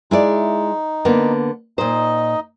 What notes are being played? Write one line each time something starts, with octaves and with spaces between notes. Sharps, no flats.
G#3 D#4 E4 D5
D3 A#3 B3
A#2 D#4 C5 D#5